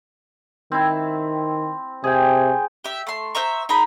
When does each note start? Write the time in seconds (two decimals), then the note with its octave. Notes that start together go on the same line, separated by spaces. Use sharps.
0.72 D#3 C4 E4
2.04 C3 G#4 G5
2.84 G4 E5
3.07 A3 C6
3.35 C5 E5 A#5 C#6
3.69 D#4 G#4 A#5 B5